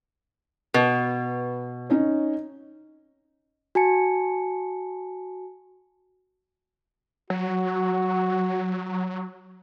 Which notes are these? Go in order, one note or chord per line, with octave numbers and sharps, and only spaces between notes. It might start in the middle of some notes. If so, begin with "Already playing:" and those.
B2 B4
C#4 D#4 C#5
F#4 G#5 A5 C#7
F#3 F#4